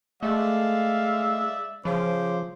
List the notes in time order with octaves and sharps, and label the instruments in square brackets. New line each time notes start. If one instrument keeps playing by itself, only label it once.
[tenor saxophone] G#3 [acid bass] A3 [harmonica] D5 E5 [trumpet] F5
[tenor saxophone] C#3 [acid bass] F3 [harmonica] C5 D6